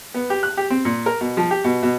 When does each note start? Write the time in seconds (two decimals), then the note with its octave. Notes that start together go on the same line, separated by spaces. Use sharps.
0.14 B3
0.30 G4
0.43 F#6
0.57 G4
0.70 C4
0.85 A#2
1.06 A#4
1.21 B2
1.37 F3
1.51 G4
1.64 B2
1.83 B2